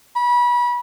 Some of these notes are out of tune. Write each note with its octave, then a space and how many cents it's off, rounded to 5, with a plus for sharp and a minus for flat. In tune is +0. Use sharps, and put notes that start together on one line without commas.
B5 -30